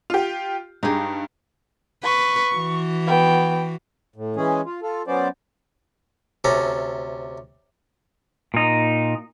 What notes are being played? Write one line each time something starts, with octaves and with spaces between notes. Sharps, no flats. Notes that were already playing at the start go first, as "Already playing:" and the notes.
F4 G4
G2 D#4 G4 G#4
B4 C#6
E3 F#4
B3 G5
A2
E3 G#3 C#4 G#4
F4
F4 A4
F#3 B3 C#4 C5 D5
D2 C3 C#4 A4 A#5
A#2 D#4